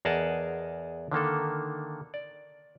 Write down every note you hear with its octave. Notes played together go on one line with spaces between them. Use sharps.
E2 G#4 A#4 D#5 F#5 A5
D3 D#3 A#3 A4
D5